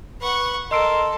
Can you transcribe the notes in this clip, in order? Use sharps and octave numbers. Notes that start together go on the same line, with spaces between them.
B4 F#5 C#6
A4 A#4 D#5 C6 E6 D7